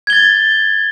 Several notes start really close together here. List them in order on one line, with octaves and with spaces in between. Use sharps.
G#6 G7 A6